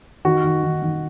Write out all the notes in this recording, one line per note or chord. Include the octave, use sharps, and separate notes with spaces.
D#3 F#4
D#3
D#3
D#3